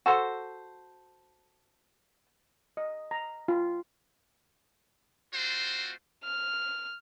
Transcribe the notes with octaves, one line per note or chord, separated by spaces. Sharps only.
F#4 A4 C5
D#5
A#5
F4
A3 C4 F4 F#4 C5
F6